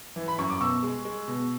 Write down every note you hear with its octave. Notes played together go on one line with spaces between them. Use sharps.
E3
B5
F#2 C#6
D6
B2 C#6 E6
G#3
G#3
B2